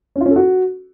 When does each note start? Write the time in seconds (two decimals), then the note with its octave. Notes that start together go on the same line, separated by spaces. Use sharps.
0.16 C#4
0.21 F4
0.26 C#4
0.31 A4
0.36 F#4